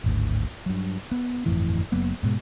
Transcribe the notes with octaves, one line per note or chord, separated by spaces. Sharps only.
D1 G#1 D2
G2 F#3
B3
G1 F2 A2 E3
F#1 F#3 A#3 B3
G#2 B2 G#3